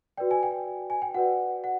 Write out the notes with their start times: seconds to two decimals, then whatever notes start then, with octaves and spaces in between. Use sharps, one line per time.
0.17 F#4 B4 D5 G5
0.31 G#5
0.43 G5
0.90 G#5
1.02 G5
1.14 F#4 B4 D5 F#5
1.64 F#5